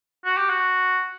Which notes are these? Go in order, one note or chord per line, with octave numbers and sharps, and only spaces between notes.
F#4
G4
F#4